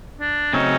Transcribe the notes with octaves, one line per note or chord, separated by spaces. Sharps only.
D4
C#3 F#3 A3 C4 C#4 D#4